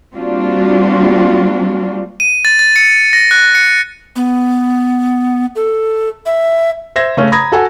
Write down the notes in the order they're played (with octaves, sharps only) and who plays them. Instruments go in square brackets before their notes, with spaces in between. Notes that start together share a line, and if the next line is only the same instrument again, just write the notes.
[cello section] G3 A#3 C4 D4 F4 F#4
[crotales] D#7
A6
A6
C#7
A#6
F#6
C#7
[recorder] B3
A4
E5
[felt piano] C5 E5 G#6 A#6
C#3 A3 C#4
A#5 B5 D#6 G#6 A#6
F#4 A4 F#5 G#5